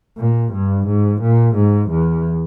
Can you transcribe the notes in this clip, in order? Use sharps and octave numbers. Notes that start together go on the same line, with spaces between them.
A#2
G2
G#2
A#2
G#2
E2